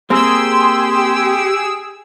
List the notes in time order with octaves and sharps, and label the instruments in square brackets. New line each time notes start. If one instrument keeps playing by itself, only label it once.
[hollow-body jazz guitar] A#3 C4 A#4 [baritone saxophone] G4 [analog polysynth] G#4 E6 [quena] C6